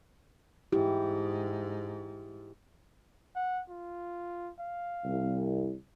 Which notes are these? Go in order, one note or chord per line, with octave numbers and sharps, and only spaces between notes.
G#2 E4 G4
F#5
F4
F5
C2